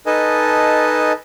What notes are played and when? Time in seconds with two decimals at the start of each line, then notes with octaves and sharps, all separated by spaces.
0.06 D#4 A4 B4 D#5 G#5 A5